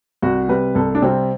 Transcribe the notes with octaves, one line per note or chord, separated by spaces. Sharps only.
C2 F#4
C3 G3 B4
C2 A4
D4
C3 G3 C4